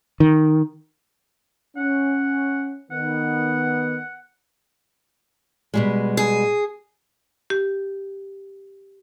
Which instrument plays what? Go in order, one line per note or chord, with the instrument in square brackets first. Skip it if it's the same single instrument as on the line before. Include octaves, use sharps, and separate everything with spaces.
[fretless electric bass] D#3
[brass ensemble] C#4 [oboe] F#5
[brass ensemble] D#3 B3 [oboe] F#5
[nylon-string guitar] B2 G3 G#3
[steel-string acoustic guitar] G#4
[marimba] G4